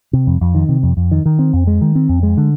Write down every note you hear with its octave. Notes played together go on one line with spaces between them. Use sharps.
C3
F2
F2
D#3
C3
F2
F2
D#3
D#3
C4
F2
G#3
D#3
C4
F2
G#3
D3